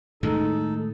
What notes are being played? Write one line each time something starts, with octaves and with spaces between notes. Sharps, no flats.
A2 D#3 G#3 D#4 A4